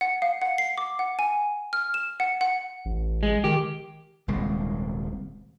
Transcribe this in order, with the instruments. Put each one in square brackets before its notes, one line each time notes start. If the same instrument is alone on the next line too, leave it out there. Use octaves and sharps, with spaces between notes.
[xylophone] F#5
F5
F#5
C7
D6
F#5
G#5
F6
E7
F#5
F#5
[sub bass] A1
[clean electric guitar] G#3
[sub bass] D#3 [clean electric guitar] G4
[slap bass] D#1 C2 G#3